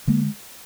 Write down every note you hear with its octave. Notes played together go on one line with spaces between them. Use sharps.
D3 G#3 A#3